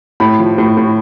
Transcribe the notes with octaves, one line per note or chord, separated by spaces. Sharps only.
A2 B5
F3
A2
A2